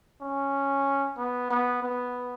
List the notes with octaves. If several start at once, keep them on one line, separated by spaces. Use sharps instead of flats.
C#4
B3
B3
B3